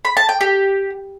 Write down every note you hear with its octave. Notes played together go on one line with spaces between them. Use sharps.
B5
A5
G5
G4